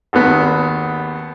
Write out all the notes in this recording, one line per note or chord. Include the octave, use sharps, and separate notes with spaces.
G#1 D#2 B3